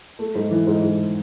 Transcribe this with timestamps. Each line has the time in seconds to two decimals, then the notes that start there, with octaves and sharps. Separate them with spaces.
0.19 A3
0.35 G#2
0.51 E3
0.67 G#2
0.83 G#2